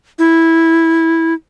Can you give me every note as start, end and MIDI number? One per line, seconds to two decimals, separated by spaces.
0.19 1.34 64